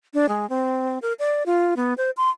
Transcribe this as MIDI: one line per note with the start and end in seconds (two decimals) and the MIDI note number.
0.14 0.29 62
0.29 0.48 56
0.50 0.99 60
1.02 1.13 70
1.19 1.43 74
1.46 1.74 65
1.76 1.94 59
1.98 2.11 72
2.17 2.29 84